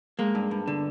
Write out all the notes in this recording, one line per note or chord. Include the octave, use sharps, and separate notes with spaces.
G#3 A#3
G2
G2
D3